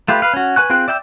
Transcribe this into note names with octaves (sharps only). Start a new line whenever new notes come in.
A3 F4 G4 B4
B4 F5
C#4 F#4
B4 G#5 C#6 F#6
C4 F4 G#4 G5 F#6
D5 E5 G5 B5 E6